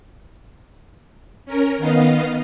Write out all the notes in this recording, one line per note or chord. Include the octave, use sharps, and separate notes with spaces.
C#4 A#4
D#3 B3 D#5 F5